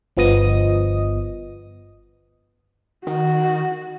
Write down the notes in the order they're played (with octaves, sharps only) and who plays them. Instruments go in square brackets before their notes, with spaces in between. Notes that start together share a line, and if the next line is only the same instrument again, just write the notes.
[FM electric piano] G1 F3 B3 D#5 D#6
[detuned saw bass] D#3 [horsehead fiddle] F#4